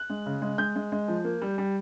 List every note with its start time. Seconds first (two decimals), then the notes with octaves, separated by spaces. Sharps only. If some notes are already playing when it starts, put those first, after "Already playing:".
Already playing: F#6
0.10 G#3
0.26 C#3
0.42 G#3
0.58 G#3 G6
0.76 G#3
0.92 G#3
1.08 F3
1.24 A#3
1.42 G3
1.58 G3